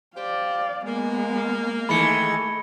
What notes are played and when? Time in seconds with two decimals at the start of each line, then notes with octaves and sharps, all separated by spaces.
0.17 G4 C5 D5 F5
0.86 G#3 A#3 B3
1.89 D#3 E3 G#3 A3 B5 C#7